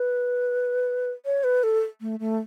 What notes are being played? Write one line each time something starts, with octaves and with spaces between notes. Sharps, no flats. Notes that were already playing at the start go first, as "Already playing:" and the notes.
Already playing: B4
C#5
B4
A4
A3
A3